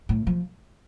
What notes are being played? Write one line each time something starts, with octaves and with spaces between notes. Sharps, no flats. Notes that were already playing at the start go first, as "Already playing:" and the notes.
A2
F3